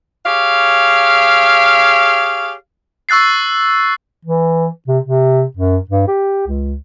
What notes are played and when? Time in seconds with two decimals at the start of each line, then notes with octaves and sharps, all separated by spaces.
0.25 G4 G#4 C#5 F5
3.09 C#6 E6 F#6 A6 C7
4.25 E3
4.88 C3
5.04 C3
5.57 F#2
5.90 G2
6.08 G4
6.47 C#2